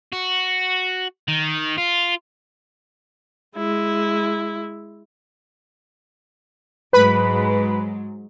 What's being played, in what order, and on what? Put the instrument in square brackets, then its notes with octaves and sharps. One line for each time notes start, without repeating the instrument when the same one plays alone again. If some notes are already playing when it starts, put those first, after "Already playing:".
[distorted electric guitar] F#4
D#3
F4
[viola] G#3 E4
[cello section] G#2 F#3 G#3 [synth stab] B4 B5